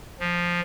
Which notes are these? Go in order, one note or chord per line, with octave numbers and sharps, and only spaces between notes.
F3